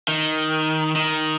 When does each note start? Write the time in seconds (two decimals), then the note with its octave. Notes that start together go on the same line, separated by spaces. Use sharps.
0.08 D#3
0.95 D#3